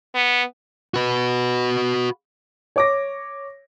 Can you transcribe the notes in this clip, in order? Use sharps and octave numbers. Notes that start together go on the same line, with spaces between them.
B3
F#4 B4
C#5 D6 A#6